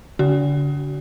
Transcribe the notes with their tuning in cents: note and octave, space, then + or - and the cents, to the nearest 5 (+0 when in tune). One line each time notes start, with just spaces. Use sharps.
D3 -40 F#4 +25